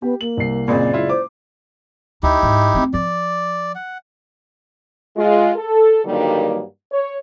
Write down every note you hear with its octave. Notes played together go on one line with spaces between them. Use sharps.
B3 G4
A#3 F#7
C2 C7
F#1 A#2 C4 G#4 D5 B5
G#3 E4 F4
C5 D6
D2 D#4 E4 G4
G#2
A3 C4
F3 D5
F#5
G#3 F4
A4
G2 D3 D#3 F#3 G3 A#3
C#5